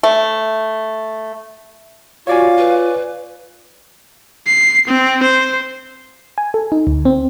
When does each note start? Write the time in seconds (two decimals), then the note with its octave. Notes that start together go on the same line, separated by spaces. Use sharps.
0.03 A3
2.27 F4 F#4 C#5 D5 F5 G#5
2.58 B4
4.47 C7
4.87 C4
5.23 C5
6.38 G#5
6.54 A4
6.72 D#4
6.87 D2
7.05 C4